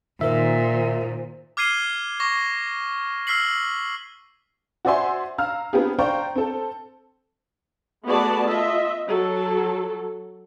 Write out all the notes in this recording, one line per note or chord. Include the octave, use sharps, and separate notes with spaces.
A#2 D#3 A#4 C5 E5
D6 F6 G#6 C7 D#7 G7
C#6 D6 A#6
E6 F6 B6 C7 F#7
F#4 C5 D5 E5 G#5 C6
F5 A#5 E6 F6
B3 C4 D4 F4 G4 G#4
C5 D5 F5 G5 A#5 C#6
C4 A4
A3 B3 F#4 G#4 D5 A5
F4 D#5 E5
F#3 A4